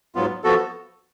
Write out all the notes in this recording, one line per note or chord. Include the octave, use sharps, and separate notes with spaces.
G#2 F#3 B3 F4
F3 B3 F#4 A4